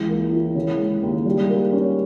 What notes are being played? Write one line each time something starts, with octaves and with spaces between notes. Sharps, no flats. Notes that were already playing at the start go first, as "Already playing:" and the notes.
Already playing: C#2 E3
A#3
E4
C#3
G#3
D#2
G3
A#3
C#4